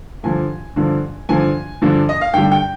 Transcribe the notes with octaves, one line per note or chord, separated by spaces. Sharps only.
G2 D3 F3 G#5
G2 D3 F3
G2 D3 F3 G#5
G2 D3 F3
D#5
F5
G2 D3 G3 G5
G5